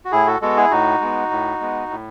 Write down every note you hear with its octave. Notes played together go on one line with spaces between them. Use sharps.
F#4
A2 E4 G#4
F#4 A4
G#3 B3 F#4 A4
E4 G#4
A2 D#4 F#4
G#3 B3
A2
G#3 B3
A2